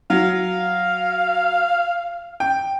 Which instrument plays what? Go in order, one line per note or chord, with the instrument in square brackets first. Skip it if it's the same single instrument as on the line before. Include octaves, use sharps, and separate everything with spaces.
[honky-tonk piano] F#3 [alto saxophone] F5
[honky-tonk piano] G5